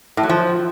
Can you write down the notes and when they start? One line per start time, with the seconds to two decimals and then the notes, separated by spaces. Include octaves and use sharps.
0.17 A2
0.23 F#3
0.30 F3